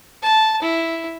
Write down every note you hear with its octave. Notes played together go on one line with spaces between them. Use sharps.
A5
E4